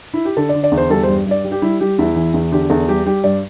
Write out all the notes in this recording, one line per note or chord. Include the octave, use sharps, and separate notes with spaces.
E4
G4
D3 A4
D5
D3
D5
E2
C5
G3 A4
C5
G2
G2 D5
G3
G4
G3 E4
G3 G4
E2 E4
E3
E2
D3 G4
E2 A4
G3 G4
G3 G4
G2 D5